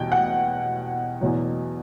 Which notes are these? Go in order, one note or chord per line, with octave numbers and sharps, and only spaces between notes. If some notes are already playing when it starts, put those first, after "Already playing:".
Already playing: E2 B2 G3 G5
F#5
E2 B2 F#3